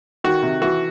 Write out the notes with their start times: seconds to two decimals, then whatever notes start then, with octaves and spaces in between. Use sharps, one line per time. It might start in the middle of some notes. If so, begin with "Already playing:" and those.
0.24 D#3 F#4
0.43 C3
0.61 E3 F#4